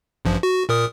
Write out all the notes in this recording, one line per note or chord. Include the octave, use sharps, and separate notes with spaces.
A1 G2 F3
F#4
A#2 A#4 D#6